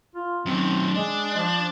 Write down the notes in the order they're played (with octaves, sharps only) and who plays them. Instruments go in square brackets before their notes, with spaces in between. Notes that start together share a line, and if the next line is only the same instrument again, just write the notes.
[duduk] F4
[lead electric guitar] F#2 D#3 [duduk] C4
[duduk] G#3 [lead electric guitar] D4
[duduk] F3